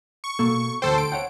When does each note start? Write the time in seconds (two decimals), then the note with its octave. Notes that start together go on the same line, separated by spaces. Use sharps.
0.24 C#6
0.39 B2 A#3 A4
0.82 D2 D#3 A4 C5 G5
0.98 D7
1.12 C#5 F#5 G5